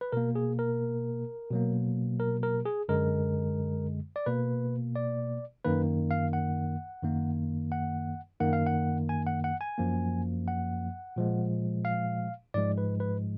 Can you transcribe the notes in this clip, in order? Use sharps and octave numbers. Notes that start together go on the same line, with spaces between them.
B4
B2 A#3 A#4
G#4
A#4
B2 F#3 A#3
A#4
A#4
G#4
F#2 D3 G#3 A#4
D5
B2 A#3 B4
D5
F#2 D#3 A#3 B4
F5
F#5
F#2 D#3 A#3
F#5
F#2 D#3 A#3 F#5
F5
F#5
G#5
F#5
F#5
G#5
F#2 F3 A#3
F#5
A#2 F3 G#3
F5
G#2 F3 G#3 D5
B4
B4